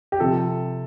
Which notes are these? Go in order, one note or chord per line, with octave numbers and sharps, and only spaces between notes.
G4
C3 F3 A4